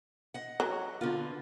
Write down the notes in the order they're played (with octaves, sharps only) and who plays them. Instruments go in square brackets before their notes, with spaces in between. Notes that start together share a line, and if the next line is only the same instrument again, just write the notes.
[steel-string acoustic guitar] D#5 F#5
[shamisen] F#3
[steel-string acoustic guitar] D3 B3 F4